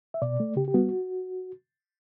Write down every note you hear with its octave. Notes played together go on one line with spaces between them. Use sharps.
E5
B2 D5
A3
C#3 G4
G4
G3 B3 F#4